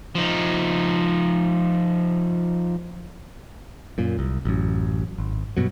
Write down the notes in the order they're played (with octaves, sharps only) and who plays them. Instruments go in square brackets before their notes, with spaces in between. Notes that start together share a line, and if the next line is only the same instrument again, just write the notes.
[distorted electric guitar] F3 D#4
[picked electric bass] F#2 A#2
C2
A1 F#2
G#1
G2 B2 F#3